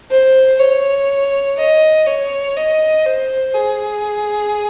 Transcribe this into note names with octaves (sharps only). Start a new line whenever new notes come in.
C5
C#5
D#5
C#5
D#5
C5
G#4